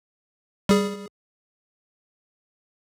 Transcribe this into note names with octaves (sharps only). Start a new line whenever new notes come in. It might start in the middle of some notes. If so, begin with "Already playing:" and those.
G3 G#4